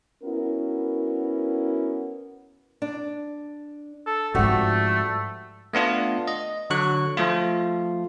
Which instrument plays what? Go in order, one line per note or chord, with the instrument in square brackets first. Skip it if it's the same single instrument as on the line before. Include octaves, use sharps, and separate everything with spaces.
[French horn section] B3 C#4 E4 F#4 A#4
[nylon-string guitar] D4
[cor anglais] A4
[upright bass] G#2 F3 [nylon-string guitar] G3 C4 F#4 [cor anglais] A3
[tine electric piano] A3 B3 D4 F4
D#5
D3 F#3 C#6 F#6
F3 A3 F4